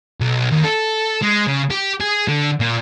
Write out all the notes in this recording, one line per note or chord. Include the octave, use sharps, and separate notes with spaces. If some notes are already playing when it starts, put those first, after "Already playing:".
B1
D#2
A4
G#3
C#3
G4
G#4
D3
A#2